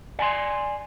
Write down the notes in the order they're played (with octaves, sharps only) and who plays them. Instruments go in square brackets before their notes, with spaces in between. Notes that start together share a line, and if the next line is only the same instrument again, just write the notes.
[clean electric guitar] D5 G#5 A5 C6